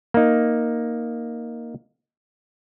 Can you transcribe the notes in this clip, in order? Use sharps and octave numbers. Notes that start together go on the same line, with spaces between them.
A#3 D#4